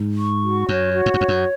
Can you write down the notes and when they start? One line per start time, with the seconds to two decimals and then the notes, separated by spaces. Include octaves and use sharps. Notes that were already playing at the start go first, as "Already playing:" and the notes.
Already playing: G#2
0.18 C#6
0.43 F#4
0.69 F#2 C#5
0.94 F#4
1.06 G#2
1.14 F#2
1.19 F2 C#5
1.28 F#2